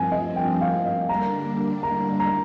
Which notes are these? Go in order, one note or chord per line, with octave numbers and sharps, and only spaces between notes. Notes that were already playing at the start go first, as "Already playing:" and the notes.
Already playing: G2 F3 C4 G#5
D#5
G5
F5
D#5
D3 G3 A#3 D4 A#5
A#5
A#5